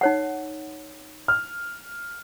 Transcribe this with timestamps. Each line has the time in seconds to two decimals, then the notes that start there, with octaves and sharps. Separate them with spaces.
0.01 D#4 C#5 F#5
1.28 F6